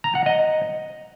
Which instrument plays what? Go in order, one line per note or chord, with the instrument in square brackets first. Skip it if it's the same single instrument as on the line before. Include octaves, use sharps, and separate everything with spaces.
[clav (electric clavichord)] A#5
F#5
D#5